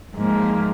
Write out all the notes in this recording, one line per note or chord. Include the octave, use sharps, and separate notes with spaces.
G#2 F3 A#3